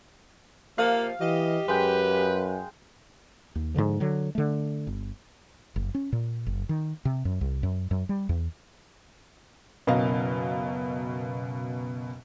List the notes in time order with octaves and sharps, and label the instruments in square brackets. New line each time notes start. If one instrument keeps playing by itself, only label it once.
[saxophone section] C3 F3 [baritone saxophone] A#3 [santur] F5
[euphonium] E3 [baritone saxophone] G4 [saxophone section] D#5
[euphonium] F#2 [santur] G#3 G5 [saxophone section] B4
[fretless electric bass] D#2
G#2 B2 D3 F3
D3 F#3
D3 A3
G1
F#1
C#4
A#2
F#1
D#3
C3
F#2
C2
F#2
F#2
G3
E2
[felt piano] F#1 B2 C#4 A#4 D#5 F5